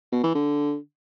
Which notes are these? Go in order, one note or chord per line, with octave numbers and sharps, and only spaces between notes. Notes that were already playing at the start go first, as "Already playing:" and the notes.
B2
E3
D3